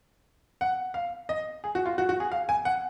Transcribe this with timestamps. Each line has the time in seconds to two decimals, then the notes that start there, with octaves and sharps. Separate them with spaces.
0.61 F#5
0.94 F5
1.29 D#5
1.64 G#4
1.75 F#4
1.86 F4
1.98 F#4
2.09 F#4
2.20 G#4
2.32 F5
2.49 G#5
2.65 F#5